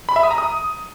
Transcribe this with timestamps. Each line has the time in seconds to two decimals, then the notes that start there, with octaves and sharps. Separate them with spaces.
0.09 B5
0.16 E5
0.23 D#6
0.31 A#5
0.38 D#6